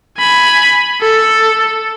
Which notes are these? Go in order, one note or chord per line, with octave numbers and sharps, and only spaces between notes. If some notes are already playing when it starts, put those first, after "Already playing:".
G#5 B5
A4